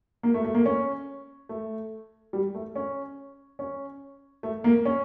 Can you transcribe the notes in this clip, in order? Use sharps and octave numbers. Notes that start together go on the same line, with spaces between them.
A#3
A3
A3
A#3
C#4
A3
G3
A3
C#4
C#4
A3
A#3
C#4